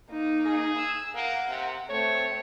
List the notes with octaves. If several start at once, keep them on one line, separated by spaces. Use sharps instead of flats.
A#3 D#4
G#4
E6
A#3 A#4 F#5
C3
A3 C4 C#5